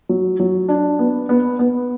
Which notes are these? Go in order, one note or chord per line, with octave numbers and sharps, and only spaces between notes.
F#3
F#3
D4
B3
B3
B3